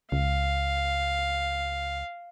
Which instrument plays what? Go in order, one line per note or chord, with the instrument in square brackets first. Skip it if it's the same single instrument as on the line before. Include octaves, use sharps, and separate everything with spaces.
[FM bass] C#2 [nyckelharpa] F5